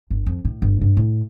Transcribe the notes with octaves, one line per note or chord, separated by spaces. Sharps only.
G1
F2
A2
G1
G2 A3
A2